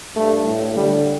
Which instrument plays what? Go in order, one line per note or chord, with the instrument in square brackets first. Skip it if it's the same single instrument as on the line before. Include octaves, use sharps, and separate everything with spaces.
[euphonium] G2 [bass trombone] A3
[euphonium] A2
[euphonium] D3 [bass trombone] G3